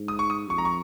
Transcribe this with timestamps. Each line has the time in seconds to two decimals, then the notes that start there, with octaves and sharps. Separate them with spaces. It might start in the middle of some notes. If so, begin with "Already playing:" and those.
Already playing: G#2
0.08 D#6
0.19 C#6
0.30 D#6
0.50 F2 C#6
0.58 A#5
0.65 C#6